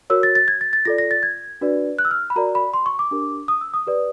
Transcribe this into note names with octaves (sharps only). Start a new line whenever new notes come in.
F#4 A#4 C#5 E6
A6
A6
G#6
A6
A6
F4 A4 D5 A#6
A#6
A6
G#6
D4 F#4 B4 D5
F#6
E6
F6
B5
F#4 A#4 D5 A#5
B5
C6
C#6
D6
D4 G4 A#4
D#6
E6
D#6
G4 B4 D5